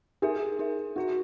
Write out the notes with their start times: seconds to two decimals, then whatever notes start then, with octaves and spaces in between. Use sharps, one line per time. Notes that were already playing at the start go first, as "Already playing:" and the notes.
0.22 D#4 G#4 A#4 E5
0.59 D#4 A#4 E5
0.96 D#4 F#4 A#4 E5